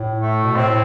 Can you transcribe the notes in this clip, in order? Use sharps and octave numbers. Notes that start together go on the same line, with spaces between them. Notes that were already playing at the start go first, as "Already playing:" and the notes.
Already playing: A2
A3
B2
A2 C4